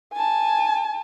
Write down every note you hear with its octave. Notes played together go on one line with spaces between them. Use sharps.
G#5 A5